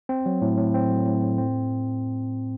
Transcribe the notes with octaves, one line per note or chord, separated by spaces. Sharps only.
C4
F#3
A2
A2
C4
F#3
A2
C4
C4